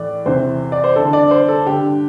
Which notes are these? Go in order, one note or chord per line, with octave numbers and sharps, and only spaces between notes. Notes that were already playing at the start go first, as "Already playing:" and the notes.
Already playing: A2 E3 D5
E2 C3 E3 C5
D5
C5
G2 D3 A4
D5
C5
A4
G2 D3 G4